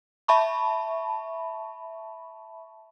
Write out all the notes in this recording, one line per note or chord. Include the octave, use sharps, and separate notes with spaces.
E5 A5 B5 C#6